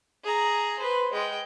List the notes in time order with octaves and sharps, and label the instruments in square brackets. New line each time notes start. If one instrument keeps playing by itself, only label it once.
[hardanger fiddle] G#4 A#5
B4 C5
G#3 G5